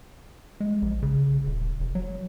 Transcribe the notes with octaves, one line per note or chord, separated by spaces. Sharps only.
G#3
A#1
C#3
D#1
F1
F#3